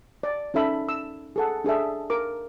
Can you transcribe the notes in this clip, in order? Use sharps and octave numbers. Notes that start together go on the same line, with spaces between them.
D5
C#4 D#4 A4 E5 B5
E6
G#4 A4 F#5
D4 G#4 A4 E5
A#4 D6